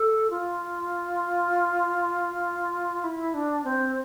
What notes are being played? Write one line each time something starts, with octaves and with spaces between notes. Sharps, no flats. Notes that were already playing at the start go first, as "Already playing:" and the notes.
Already playing: A4
F4
E4
D4
C4